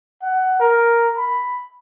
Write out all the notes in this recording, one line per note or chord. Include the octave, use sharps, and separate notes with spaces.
F#5
A#4
B5